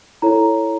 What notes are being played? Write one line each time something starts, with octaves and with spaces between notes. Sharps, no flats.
E4 A4 C#5 A#5